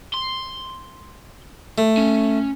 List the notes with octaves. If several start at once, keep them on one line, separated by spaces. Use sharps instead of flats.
C6
A3
C#4